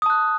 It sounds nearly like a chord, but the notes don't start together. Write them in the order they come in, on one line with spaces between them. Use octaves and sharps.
D#6 A5 F#6